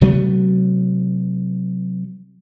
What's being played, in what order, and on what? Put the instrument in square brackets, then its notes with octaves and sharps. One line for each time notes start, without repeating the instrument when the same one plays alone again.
[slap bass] C3 F#3 A3 B3